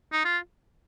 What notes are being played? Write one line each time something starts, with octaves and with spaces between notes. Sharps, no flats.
D#4
F4